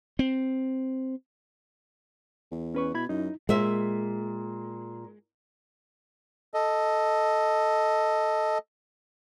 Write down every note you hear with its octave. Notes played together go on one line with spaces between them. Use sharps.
C4
E2
C#4 B4 C#6
B2 E4 B5 G#6
F#2 D#4 E4
A#2 G#3 E5
A4 D#5